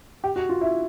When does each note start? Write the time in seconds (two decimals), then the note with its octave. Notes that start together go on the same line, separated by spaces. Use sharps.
0.24 G4
0.36 F#4
0.49 F4
0.61 E4